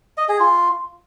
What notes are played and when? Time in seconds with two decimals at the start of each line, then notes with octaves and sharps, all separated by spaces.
0.17 D#5
0.29 G#4
0.40 F4